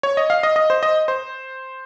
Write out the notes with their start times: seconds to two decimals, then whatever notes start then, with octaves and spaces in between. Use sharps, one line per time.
0.03 C#5
0.17 D#5
0.30 F5
0.43 D#5
0.56 D#5
0.70 C5
0.83 D#5
1.08 C5